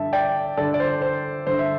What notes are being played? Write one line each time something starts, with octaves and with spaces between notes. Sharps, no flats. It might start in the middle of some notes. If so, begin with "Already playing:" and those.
Already playing: G2 D3 E5 A5
D5 G5
G2 D3 A4 D5
D5
C5
C5
G2 D3 C5
E5